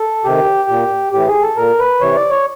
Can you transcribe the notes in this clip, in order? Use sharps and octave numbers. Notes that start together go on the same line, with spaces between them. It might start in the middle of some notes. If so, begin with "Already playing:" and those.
Already playing: A4
C3 D#3 G4
A#2
A2 E3 G4
G#4
A4
A#2 A#4
B4
C3 E3 C#5
D5
C#5